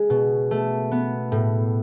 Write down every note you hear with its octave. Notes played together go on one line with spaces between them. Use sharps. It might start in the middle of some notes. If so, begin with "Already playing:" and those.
Already playing: G#3
B2
A3
B3
A2